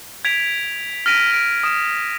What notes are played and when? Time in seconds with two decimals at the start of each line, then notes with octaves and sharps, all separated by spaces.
0.25 G#6 B6 D7 F7
1.06 F6 A#6 B6 D7 D#7 F7
1.31 F6 D7
1.63 D#6 E7